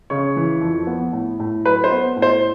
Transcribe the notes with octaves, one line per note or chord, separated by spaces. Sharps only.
C#3 C#5
E3
F2
B3
A2
A2
F#3 B4
C5
B3
A2
C5